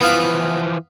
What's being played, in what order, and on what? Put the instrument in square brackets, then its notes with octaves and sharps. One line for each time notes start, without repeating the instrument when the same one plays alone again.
[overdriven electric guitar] E3 F3 [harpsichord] B3 F5 B5